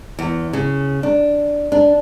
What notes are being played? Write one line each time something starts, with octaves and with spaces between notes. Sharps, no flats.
E2
C#3
D4
D4